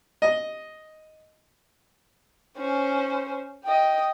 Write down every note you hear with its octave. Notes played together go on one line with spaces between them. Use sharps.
D#5
C#4 C5
D#5 G5